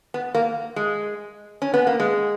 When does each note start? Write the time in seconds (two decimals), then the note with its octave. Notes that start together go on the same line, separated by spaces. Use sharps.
0.14 B3
0.35 A#3
0.76 G#3
1.62 C#4
1.74 B3
1.87 A#3
2.00 G#3